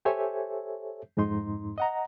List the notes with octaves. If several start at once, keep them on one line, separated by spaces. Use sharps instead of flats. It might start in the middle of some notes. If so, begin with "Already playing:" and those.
G4 A4 C5 C#5 E5 G#5
F2 G#2 G#3 D#4 C6
D#5 F#5 A#5